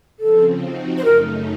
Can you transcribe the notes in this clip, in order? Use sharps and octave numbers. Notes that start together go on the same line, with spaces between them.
C#3 F3 C4 A4
F3 C4 D#4 F#4
C5
F#2 C#3 A3 D#4 A#4